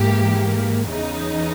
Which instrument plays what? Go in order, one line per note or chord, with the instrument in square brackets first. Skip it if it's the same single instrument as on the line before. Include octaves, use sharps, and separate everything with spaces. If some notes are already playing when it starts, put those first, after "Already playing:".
Already playing: [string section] G#2 E3 A#3 G4
E2 C#3 E3 D#4